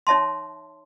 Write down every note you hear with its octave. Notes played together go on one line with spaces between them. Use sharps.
D#4 C#5 E5 A5 C6